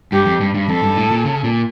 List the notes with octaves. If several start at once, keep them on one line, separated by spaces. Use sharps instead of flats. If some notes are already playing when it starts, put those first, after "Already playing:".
G2 G4
F2
G2
G2
F2 A4
G2
A2
A#2
C#3
A#2